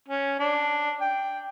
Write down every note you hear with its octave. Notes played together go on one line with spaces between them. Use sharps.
C#4
D4
G5